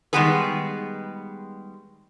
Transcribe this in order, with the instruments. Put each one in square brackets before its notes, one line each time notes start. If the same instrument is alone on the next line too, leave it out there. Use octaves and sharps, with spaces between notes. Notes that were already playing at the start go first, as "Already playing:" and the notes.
[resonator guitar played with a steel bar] D#3 G3 G#3 B3 G#4 B4